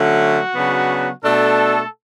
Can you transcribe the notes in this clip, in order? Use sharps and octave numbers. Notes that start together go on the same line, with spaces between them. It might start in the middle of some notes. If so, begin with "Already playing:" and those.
Already playing: D3 F#3 A3 C#4 F#4
C#3 F#3 B3 D4
B2 A3 D4 A4